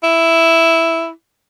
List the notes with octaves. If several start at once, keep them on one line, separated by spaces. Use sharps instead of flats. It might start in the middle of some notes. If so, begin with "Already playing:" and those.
E4